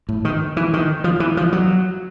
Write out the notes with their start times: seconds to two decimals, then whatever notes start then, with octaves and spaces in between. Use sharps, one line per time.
0.09 A2
0.25 D#3
0.57 E3
0.73 D#3
1.04 F3
1.20 E3
1.37 F3
1.52 F#3